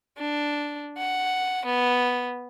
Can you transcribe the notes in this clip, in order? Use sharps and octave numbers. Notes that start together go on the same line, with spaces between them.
D4
F#5
B3